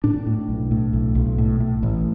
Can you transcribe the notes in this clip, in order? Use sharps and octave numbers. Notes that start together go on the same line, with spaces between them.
A2 D4
A2
B1
A2
B1
B1
A2
A2
A1